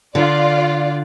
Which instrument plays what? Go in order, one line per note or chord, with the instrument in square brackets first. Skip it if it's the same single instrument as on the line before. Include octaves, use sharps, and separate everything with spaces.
[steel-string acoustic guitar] D3 [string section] F4 D5